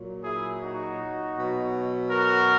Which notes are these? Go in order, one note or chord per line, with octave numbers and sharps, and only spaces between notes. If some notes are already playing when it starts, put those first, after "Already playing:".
Already playing: A#2 F#3
E4 G#4
D#4 F#4
B2 F#3
F#4 A#4